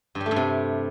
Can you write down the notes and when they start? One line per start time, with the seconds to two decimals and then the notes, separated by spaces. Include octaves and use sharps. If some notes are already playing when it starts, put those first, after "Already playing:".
0.15 G2
0.20 G3
0.26 A3
0.31 G2
0.36 C3